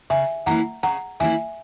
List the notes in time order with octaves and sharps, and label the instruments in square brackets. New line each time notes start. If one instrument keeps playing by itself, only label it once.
[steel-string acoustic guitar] C#3 [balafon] E5 G#5
[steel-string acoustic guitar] E3 A#3 C#4 E4 [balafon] F#5 A#5
[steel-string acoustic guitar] C#3 [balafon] F#5 A#5
[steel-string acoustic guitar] E3 A#3 C#4 E4 [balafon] E5 G#5